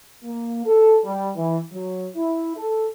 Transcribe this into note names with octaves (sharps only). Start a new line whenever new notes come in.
A#3
A4
G3
E3
F#3
E4
A4